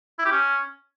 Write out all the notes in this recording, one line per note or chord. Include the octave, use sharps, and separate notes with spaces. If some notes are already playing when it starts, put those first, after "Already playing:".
E4
G4
C#4